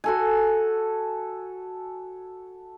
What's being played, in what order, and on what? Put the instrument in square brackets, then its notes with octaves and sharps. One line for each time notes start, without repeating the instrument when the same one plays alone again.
[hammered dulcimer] F#4 A4 G#5